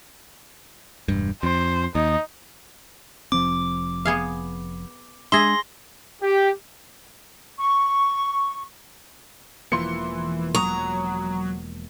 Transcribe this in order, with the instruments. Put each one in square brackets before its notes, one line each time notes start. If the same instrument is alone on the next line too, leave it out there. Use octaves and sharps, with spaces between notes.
[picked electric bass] E1 G2
[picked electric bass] F2 [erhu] C5
[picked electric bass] D#2 [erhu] D#4
[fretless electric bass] F1 F3 C4 [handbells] D6
[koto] B3 G#4 F5
[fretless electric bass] G#3 D4 [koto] G#4 E5 [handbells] C6 A#6
[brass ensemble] G4
[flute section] C#6
[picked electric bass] E1 F3 A#3 [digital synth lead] E3 [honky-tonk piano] C6 C#7
[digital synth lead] F#3 [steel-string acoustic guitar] A#5 [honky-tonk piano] C#6 D#6